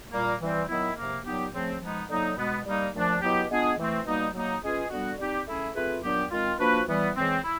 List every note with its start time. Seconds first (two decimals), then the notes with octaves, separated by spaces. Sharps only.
0.12 A#2 G3 A#3
0.41 E3 G3 C4
0.69 D#3 F#3 B3 E4
0.96 C3 F3 A#3
1.25 A#2 F#3 B3 D#4 G4
1.53 C#3 F3 A3 C4
1.81 F3 G#3 B3 D#4
2.08 D3 F#3 A#3 D#4
2.37 B2 G#3 B3
2.65 G3 A#3 D#4
2.93 A#2 F3 A3 D4
3.21 B2 F#3 B3 E4 G4
3.50 G#3 B3 D4 F4 G#4
3.78 E3 A3 C4
4.06 B2 G3 A#3 D#4
4.34 F#3 A#3 D#4
4.63 G#3 C#4 F4 G#4 B4
4.90 D3 G3 B3 D4 F#4
5.18 G3 C4 D#4 G4
5.46 A3 C#4 E4 G#4
5.75 A3 C4 F4 G#4 B4
6.03 A#2 F#3 B3 D4 G4
6.31 D#3 G#3 C4 F4
6.59 F3 A#3 D4 F#4 B4
6.88 E3 G3 B3
7.16 C#3 E3 G#3 C4
7.43 E4